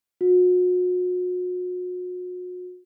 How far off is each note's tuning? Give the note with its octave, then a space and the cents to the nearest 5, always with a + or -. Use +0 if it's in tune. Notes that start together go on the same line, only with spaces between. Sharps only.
F#4 -40